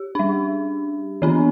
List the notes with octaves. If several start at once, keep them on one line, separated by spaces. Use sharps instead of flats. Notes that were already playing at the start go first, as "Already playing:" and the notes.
Already playing: G4
G3 D4
E3 B3 D4